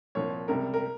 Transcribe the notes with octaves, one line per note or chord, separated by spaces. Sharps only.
C2 A#2 F3 C#5
C#2 C3 G3 A#4
A#4